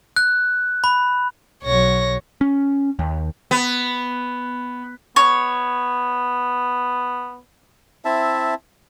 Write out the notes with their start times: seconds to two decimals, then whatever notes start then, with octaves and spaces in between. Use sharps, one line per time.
0.16 F#6
0.84 B5
1.64 B1 F#3 C#5 A#6
2.41 C#4
2.99 D#2
3.51 B3
5.16 B3 C#5
8.05 C4 E4 E5 A5